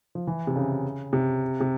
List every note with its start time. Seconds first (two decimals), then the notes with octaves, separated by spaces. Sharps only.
0.15 F3
0.27 E3
0.47 C3
0.56 C#3
1.13 C3
1.60 C3